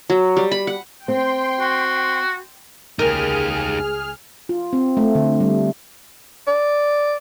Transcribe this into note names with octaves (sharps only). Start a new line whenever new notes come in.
F#3
G3
B5
F#5
C4 G5 C6
F#4
C#2 D#4 G4 G#4 A#4 F6
F4
C4
A3
D3
G3
D5